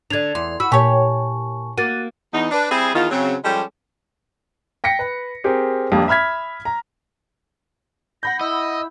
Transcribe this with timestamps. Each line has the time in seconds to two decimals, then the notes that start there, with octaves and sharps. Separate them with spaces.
0.10 D3 D4 D5 G#6 F7
0.35 E2 C6
0.60 F#4 B5 E6
0.72 A#2 G4 C#5 G#5 A5 C#6
1.78 A#3 F#4 A6 D#7
2.33 E2 D#4
2.51 D4 B4
2.71 G3 C4 E4 G#4
2.95 E2 D#3 F4
3.10 C#3 F#3 C4
3.44 F3 G3 G#3 C#4 G4 A4
4.84 G5 A#6 B6 C#7
4.99 B4
5.44 C4 G4 G#4 A#4
5.92 A#1 F2 G3 A#3
6.08 E5 B5 F6 G#6 B6
6.65 A#5
8.23 F#5 B5 G6 A#6
8.41 E4 D#5 E6